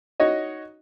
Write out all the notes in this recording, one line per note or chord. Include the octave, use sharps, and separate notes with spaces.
D#4 F#4 C#5 D#5